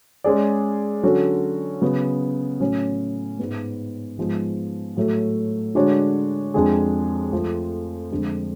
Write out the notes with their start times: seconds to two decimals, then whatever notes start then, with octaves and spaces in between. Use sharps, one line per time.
0.24 G#3 C#4 G#4 D5
1.03 D3 F#3 C#4 F#4 A4
1.82 C#3 F#3 B3
2.60 A2 F#3 C#4
3.39 G#2 G#3 B3
4.17 G#2 F3 G#3 B3
4.97 A2 F#3 A3
5.75 D3 G#3 D4 F#4 C#5
6.54 F2 F3 G#3 D4 G#4
7.32 F2 F3 A3
8.11 F2 D3 G#3 D4